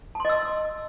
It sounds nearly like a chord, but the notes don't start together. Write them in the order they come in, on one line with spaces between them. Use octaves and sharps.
A5 C6 D#5 E6